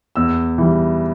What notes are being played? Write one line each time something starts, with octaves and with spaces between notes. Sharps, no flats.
E2 E6
E3 G3